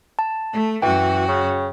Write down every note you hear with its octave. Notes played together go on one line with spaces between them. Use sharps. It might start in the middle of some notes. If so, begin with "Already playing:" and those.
A5
A3
F#2 E3 F#4 G5
C#3